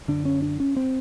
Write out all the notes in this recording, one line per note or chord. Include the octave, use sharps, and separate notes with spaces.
F#2 D3 D4
C#4
D4
C#4
C4